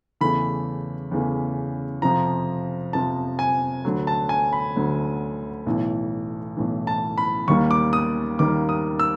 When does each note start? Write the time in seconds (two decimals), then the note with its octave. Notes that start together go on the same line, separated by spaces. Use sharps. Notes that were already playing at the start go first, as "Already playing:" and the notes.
0.21 E2 C#3 E3 A3 B5
1.11 E2 C#3 E3 A3
2.02 F2 C3 F3 A#5
2.93 F2 C3 F3 A5
3.39 G#5
3.85 D2 D3 F#3
4.07 A5
4.29 G#5
4.53 B5
4.76 D2 D3 F#3
5.66 B1 A2 E3
6.57 B1 A2 E3
6.87 A5
7.18 B5
7.48 D#2 D#3 G3 A#3 C#6
7.71 D6
7.93 D#6
8.39 D#2 D#3 G3 A#3 D6
8.69 D#6
8.99 E6